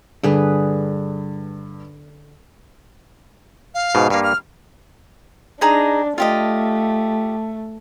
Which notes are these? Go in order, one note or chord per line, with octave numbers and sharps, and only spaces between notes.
G2 D3 G#4 B4
F5
G#2 B2
G2 A#3 F5
F6
D4 D#4 G#4 A#5
A3 F4 G4 D#5